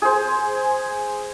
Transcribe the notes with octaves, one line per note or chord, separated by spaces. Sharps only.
G#4 C5